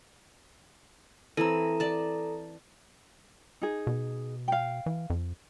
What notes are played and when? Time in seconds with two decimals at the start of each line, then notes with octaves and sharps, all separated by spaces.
1.37 E3 C4 A4 A#5
1.80 D5 A5
3.62 D#4 G#4
3.87 B2
4.48 F5 G5
4.86 E3
5.10 F2